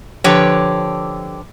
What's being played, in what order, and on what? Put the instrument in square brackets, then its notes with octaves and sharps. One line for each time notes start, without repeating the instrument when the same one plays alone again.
[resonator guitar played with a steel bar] D3 F3 G4 B4 C#5